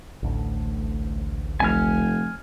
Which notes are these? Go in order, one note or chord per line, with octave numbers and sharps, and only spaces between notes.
A1 D2 A2
F1 G#5 F6